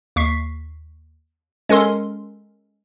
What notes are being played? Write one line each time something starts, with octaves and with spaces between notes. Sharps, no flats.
D#2 C#6 B6 C7
G#3 C#4 A4 A#4 C6